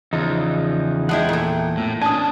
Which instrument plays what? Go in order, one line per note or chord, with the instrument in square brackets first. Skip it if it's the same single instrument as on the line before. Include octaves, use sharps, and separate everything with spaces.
[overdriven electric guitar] E2 [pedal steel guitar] C#3 F3 D#4 [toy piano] D#5
[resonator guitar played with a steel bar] F3 G#3 E4 [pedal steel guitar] F#5 G5
[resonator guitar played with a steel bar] A#2 A3
[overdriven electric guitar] A2
[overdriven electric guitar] C#4 D4 [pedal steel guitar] G#5 [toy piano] A5 D#6